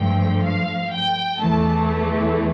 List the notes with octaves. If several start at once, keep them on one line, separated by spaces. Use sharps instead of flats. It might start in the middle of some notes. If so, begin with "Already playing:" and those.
Already playing: G2 F3 A3 G5
F5
G5
E2 E3 A3 A5
A5